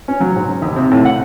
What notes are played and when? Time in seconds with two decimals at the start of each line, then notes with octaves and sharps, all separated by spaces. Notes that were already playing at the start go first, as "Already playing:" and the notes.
0.08 C#4
0.20 F#3
0.36 G#2
0.62 D#2
0.76 C3
0.91 A2
1.05 F#5